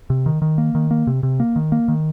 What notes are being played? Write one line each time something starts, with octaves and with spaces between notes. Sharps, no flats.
C3
D#3
D#3
A#3
D#3
A#3
C3
C3
A#3
D#3
A#3
D#3